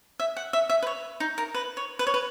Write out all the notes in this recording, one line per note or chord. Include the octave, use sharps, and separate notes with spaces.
E5
F#5
E5
E5
B4
C#5
D#4
A#4
B4
C#5
B4
C#5
B4